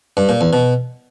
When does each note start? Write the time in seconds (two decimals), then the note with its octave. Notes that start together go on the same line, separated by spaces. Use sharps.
0.17 G2
0.29 A#2
0.41 E2
0.53 B2